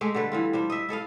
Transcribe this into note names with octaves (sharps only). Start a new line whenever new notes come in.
G#3 A3 G4
D3 G3 A3 B4
E3 G3 F4
G3 D4 C5
D#5 E5
E4 A4 D#5 F5